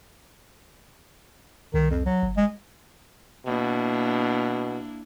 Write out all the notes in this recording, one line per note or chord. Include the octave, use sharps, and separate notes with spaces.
C2 D#3
F2
F#3
G1
G#3
B2 A#3 D4 E4